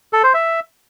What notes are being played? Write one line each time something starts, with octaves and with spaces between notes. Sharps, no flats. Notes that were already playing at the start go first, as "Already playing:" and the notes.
A4
C5
E5